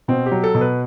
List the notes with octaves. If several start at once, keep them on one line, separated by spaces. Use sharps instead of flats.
B2 C4
G4
F#3
A4
B2
B4